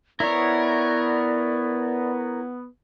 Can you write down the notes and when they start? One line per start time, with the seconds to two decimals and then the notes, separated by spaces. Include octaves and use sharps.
0.20 B3 E4 A#4 C#5 D5